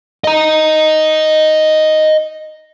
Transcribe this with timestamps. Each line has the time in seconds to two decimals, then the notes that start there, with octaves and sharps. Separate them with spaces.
0.24 D#5 A#5